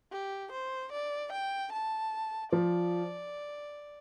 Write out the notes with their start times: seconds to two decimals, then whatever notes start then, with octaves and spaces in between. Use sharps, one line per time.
0.11 G4
0.51 C5
0.92 D5
1.32 G5
1.72 A5
2.52 F3 D5